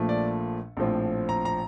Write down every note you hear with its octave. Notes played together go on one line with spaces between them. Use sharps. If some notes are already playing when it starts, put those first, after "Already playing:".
Already playing: A#1 A#2 F3 A3
D5
A#1 A2 F3 C4
A#5
A#5